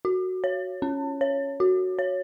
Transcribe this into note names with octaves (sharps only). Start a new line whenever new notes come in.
F#4
C#5
C#4
C#5
F#4
C#5